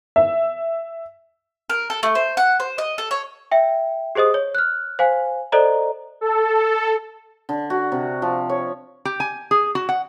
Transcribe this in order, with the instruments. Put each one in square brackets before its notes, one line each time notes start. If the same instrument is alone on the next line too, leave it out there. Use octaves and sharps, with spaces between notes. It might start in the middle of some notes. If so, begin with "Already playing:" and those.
[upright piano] E5
[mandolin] A#4
A4
A3
C5
F#5
C5
D#5
A4
C#5
[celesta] E5 G5
G4 G#4 C5 D#5 D#6
C#5
F6 F#6
C5 F5 G#5
A4 C5 D5 D#5 A#5
[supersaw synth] A4
[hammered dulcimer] D3
F#4
C3
F3
C#5
[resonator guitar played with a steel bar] G4
G#5
G#4
F#4
F#5